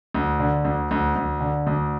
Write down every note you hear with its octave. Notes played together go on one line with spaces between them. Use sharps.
D2
D3
D2
D2
D2
D3
D2